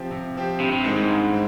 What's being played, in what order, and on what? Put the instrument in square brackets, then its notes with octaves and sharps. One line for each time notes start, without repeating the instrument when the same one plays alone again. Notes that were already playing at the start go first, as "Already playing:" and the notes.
Already playing: [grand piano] C3 F3 C4 G4
C3
F3 C4 G4
[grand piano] G2 [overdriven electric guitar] C3
[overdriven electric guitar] C3
[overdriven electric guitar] G#2 [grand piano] D#3 G#3 C4
[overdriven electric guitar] G#2
[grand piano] G2
C4